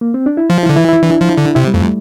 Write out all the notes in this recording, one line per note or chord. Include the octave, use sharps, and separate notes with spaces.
A#3
C4
D4
E4
F3 F4
E4
D3
E3 E4
E4
E3 D4
F3
D3
C3 E4
G3
F2 A3